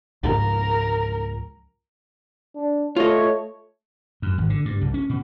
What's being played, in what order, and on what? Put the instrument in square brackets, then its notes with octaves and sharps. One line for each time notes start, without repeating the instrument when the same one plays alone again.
[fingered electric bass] C#2 G#2 F3 [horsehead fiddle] A#4
[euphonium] D4
[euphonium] A3 [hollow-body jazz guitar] F4 D#5 [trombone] C#5
[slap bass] F#2
G#1
D3
G2
C2
C#4
B2